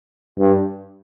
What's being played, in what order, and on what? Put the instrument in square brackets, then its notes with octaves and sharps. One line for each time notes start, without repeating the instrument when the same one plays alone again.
[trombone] G2